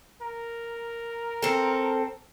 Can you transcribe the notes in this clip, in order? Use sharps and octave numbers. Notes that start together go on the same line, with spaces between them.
A#4
C4 A4